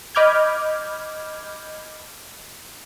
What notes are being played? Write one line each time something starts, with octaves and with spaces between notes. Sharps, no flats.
D#5 B5 D6 F6 G6 G#6